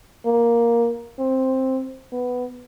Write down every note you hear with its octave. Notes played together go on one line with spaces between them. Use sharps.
A#3
C4
B3